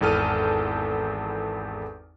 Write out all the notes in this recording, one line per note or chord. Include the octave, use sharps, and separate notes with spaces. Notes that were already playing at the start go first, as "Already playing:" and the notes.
G#1 E2 A4 F6 D#7